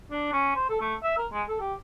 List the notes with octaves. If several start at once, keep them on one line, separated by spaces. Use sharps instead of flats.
D4
C#4
C5
A4
A3
E5
A#4
G#3
A4
G4